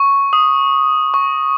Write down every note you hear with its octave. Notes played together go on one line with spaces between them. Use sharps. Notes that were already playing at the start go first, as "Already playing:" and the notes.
Already playing: C#6
D#6
C#6